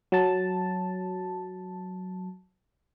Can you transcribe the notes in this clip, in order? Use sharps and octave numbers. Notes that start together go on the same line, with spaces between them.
F#3 A5